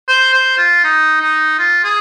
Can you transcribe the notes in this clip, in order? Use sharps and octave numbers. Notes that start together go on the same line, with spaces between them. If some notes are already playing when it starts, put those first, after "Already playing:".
C5
C5
F4
D#4
D#4
F4
G#4